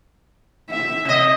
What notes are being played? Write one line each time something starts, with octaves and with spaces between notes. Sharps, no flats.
E5
C3 D#5